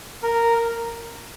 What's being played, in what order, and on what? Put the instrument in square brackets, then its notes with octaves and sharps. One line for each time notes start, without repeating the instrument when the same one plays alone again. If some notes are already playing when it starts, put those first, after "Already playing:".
[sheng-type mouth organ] A#4